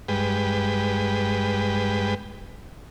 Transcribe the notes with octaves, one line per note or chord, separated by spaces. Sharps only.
G2 G#3 B4 G5